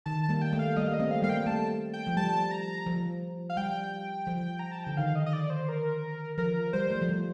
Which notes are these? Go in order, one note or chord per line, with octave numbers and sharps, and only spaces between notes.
D#3 A5
A5
G3 A#3
G5
A3
F5
G3 A#3 D#5
F5
D#5
A3 C4
F5
G3 A#3 F5
G5
A3 A5
G5
F3
G3 A5
A#5
F3
F5
G3 G5
F3
A#5
A5
D3 G5
D#3 F5
D#5
D#5
D5
C5
A#4
F3 A#4
G3 C5
A3
F3
G3